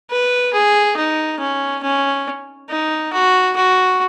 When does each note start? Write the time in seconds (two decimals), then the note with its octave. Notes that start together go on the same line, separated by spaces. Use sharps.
0.10 B4
0.53 G#4
0.97 D#4
1.40 C#4
1.83 C#4
2.69 D#4
3.13 F#4
3.56 F#4